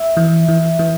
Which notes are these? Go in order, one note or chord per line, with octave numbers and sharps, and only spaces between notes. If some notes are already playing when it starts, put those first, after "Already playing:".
Already playing: E5
E3
E3
E3